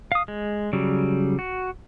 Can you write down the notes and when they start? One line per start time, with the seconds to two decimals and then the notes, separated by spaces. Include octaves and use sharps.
0.12 F5 D#6
0.28 G#3
0.73 C#3 F#3 G3
1.39 F#4